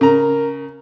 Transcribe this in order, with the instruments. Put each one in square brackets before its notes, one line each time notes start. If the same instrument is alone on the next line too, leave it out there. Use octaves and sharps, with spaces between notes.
[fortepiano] C#3 A#5 [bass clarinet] A#4